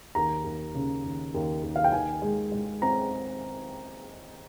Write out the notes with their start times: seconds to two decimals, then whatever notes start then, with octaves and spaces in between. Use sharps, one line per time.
0.15 D#2 A#5
0.44 D#2
0.74 C#3
1.04 D#2
1.34 D#2
1.63 D#2
1.76 F5
1.84 G5
1.92 D#3 G#5
2.22 G#3
2.52 G#3
2.82 C4 A#5